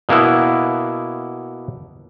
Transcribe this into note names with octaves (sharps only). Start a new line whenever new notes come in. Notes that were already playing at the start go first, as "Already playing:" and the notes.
B2 A#3 B3 E4